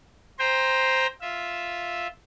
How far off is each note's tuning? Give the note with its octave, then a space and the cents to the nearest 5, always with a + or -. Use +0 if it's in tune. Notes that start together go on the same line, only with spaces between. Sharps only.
C5 +0 G5 +25 A#5 +10
F4 +0 E5 +0